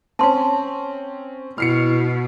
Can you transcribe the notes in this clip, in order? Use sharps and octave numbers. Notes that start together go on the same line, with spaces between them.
C4 C#4 A5 C6
B2 E4 F6 C7 C#7